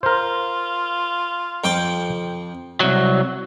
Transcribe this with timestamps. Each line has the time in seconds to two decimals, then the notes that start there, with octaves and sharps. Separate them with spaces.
0.03 F4 A#4 C5
1.64 F2 G5 D6
2.80 C2 F#3